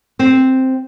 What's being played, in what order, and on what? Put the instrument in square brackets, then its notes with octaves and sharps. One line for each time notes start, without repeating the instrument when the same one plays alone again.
[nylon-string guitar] C4